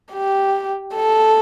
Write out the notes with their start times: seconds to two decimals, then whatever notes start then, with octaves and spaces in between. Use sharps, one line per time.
0.12 G4
0.95 A4